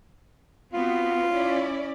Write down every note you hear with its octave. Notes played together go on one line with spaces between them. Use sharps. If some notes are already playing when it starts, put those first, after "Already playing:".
B3 C4 F4 F#4
C#4 E4 D5